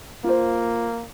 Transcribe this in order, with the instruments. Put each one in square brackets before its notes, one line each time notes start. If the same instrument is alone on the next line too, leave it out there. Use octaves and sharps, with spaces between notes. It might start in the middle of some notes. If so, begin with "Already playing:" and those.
[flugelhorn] A#3 [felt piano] F4 C5